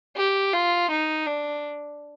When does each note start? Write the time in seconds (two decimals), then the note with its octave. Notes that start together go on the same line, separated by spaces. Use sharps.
0.17 G4
0.53 F4
0.91 D#4
1.27 D4